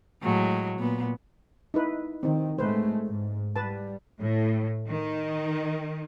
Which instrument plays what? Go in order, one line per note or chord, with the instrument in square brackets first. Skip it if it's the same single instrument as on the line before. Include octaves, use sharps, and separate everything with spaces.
[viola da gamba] A2 F#3 G#3
A#2 B3
[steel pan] D#4 E4 B4
[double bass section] D#3 [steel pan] C4 D#4
[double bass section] A2 G#3 A3 [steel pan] B4 C5
[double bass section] G#2
[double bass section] G3 [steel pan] B4 A5
[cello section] A2
D#3